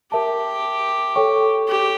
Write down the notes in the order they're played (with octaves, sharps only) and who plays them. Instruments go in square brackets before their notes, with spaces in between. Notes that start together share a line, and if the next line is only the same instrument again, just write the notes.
[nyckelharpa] G4 [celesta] A#4 E5 A5
[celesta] A4 C#5 G5 C#6
[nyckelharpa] G4